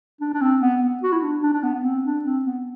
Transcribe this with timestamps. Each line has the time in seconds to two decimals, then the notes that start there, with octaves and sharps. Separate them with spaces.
0.21 D4
0.34 D4
0.41 C4
0.61 B3
0.83 B3
1.03 F#4
1.12 E4
1.22 D4
1.43 D4
1.53 D4
1.63 B3
1.74 B3
1.84 C4
2.04 D4
2.24 C4
2.45 B3